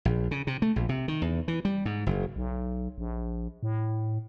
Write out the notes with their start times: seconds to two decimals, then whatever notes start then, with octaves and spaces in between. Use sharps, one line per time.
0.05 A#1
0.31 C#3
0.47 C3
0.62 A3
0.76 A#1
0.89 C3
1.08 D#3
1.22 E2
1.48 E3
1.65 G3
1.85 G#2
2.06 F#1
2.36 B1
2.98 A#1
3.63 A2